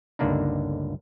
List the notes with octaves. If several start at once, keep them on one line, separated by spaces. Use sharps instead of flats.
G1 C#2 D3 A#3 D4 D#4